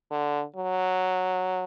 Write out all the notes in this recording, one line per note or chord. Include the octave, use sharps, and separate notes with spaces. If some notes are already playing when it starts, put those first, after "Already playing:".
D3
F#3